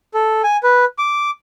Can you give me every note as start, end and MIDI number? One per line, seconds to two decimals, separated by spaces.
0.14 0.42 69
0.44 0.57 80
0.63 0.85 71
0.98 1.31 86